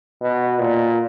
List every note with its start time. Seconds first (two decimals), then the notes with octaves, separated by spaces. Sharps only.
0.21 B2
0.59 A#2